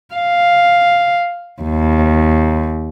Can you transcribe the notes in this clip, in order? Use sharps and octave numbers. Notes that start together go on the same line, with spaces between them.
F5
D#2